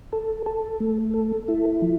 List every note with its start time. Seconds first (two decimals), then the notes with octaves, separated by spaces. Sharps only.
0.13 A4
0.46 A4
0.80 A3
1.14 A4
1.48 E4
1.82 F3